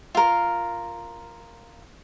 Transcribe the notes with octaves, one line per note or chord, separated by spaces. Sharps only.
F4 A#4